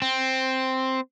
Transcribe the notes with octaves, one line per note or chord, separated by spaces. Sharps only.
C4